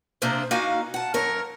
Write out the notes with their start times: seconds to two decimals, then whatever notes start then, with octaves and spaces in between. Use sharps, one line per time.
0.22 C3 A#3 D4 G#4 C5
0.51 A#3 D#4 F#4 F5 G#5
0.94 F#5 A5
1.14 F#2 A#4 C#5